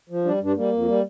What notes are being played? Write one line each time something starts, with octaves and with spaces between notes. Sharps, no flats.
F3
G3 D4
G2
D4
G3 A#3
F2
G3